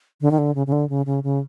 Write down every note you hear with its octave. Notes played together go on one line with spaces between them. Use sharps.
D3
D#3
D3
C#3
C#3
D3
C#3
C#3
C#3